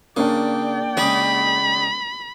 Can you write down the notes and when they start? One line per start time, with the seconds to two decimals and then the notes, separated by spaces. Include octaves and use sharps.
0.17 C#3 A#3 D4 D5 G5
0.97 C#3 G#3 G#4 B5